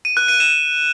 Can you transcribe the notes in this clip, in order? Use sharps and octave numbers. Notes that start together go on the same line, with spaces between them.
D#7
F#6
D#7
E7